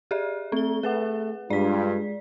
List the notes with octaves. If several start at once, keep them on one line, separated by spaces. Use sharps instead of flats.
G4 G#4 D5
A3 C4 G7
A3 G#4 B4 F#5
G2 G#3 F4 D5 B6